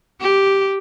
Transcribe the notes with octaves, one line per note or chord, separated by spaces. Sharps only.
G4